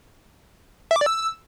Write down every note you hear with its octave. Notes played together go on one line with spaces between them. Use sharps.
E5
D6
D5
E6